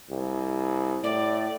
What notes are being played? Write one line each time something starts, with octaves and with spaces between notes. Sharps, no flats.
C2
A2 D5